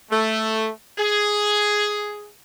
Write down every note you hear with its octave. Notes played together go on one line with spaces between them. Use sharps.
A3
G#4